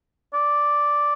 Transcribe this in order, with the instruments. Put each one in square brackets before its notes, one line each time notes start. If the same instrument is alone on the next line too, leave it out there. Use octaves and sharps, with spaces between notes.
[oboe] D5